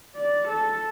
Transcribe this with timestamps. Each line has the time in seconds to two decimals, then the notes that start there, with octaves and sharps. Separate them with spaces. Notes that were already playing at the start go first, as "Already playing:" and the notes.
0.16 D5
0.48 A4